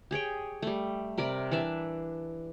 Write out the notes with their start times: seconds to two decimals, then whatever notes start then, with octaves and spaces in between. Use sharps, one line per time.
0.11 G4 G#4 C#5 G5
0.62 G3 A3
1.18 C3 A#4 D5 B5
1.51 E3 D4 D5 E5